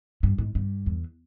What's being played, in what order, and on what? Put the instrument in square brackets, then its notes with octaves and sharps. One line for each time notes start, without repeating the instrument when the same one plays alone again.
[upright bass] G2
G#2
G2
E2